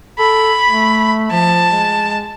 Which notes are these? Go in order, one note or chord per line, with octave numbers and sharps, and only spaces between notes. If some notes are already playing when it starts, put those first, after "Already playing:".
A4 B5
A3
F3 A5
G#3